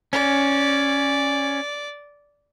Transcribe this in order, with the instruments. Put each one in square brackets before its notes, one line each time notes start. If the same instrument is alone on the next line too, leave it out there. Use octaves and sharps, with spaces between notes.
[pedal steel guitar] C#4 [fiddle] D5